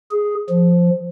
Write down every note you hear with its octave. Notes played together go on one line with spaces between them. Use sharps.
G#4
F3